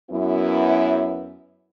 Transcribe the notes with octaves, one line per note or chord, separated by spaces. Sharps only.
F#2 B3 E4